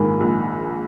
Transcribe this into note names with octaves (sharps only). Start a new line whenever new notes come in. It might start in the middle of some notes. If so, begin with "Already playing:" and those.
Already playing: A#1 G#2 D#3 A#3 G#5 B5
A#1